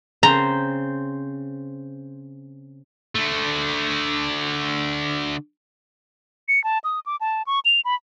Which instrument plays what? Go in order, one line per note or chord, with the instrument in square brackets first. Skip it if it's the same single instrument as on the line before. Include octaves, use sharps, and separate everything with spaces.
[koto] C#3 C4 C5 [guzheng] A#5
[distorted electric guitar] D3 A3
[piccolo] C#7
A5
D#6
D6
A5
C#6
F7
B5